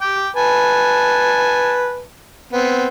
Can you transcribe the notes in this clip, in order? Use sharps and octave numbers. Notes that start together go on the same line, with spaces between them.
G5 D6
B4 G#5 A5
B3 C4